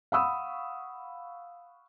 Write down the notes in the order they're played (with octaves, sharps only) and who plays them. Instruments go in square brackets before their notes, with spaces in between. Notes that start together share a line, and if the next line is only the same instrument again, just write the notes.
[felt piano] F5 F#5 B5 C#6 D#6 E6